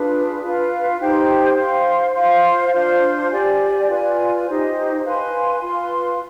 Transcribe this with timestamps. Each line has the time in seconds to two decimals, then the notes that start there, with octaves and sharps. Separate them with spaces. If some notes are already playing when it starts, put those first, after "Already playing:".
Already playing: D4 F4 G#4 B4
0.42 F4 B4 F5
1.00 D#4 G4 C5 G5
1.57 C5 F5 C6
2.15 F4 C5 F5 C6
2.73 D4 F4 C5
3.31 G4 D5 G#5
3.88 F4 B4 D5 G#5
4.47 D#4 G4 C5
5.05 B4 F5 G#5 C6
5.62 F4 B4 F5 C6